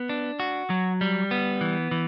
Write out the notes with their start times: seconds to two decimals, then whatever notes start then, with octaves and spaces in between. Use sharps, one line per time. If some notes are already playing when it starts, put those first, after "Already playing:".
Already playing: B3
0.09 D4
0.40 F#4
0.70 F#3
1.01 G3
1.31 B3
1.61 E3
1.91 E3